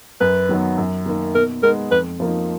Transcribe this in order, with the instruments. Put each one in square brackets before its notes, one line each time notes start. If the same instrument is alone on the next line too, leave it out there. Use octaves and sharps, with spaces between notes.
[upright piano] F#2 [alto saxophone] B4
[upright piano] D#3 F#3 B3
F#2
D#3 A#3
[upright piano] B2 [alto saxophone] A#4
[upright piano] G#3 B3 D#4 [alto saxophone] A#4
[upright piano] F2 [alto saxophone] B4
[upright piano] F3 A#3 D#4